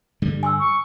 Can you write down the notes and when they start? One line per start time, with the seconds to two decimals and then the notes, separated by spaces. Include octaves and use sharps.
0.22 G2 D3 G3
0.43 G#5 C6 E6
0.59 C#6